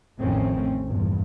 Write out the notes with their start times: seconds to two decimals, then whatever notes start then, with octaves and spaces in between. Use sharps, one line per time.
0.19 A1 F2 D#3 A3 C4 C#4
0.86 A#1 E2 G2